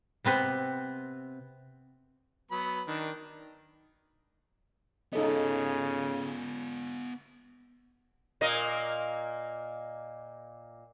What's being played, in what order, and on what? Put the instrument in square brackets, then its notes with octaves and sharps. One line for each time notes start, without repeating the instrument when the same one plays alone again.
[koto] C3 B3 C4 B4
[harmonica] F#3 B3 B5
D#3 D4
[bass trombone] C#3 [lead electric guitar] B3 F4 [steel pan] D#4 A4 D#5
[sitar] A#2 A#3 D#5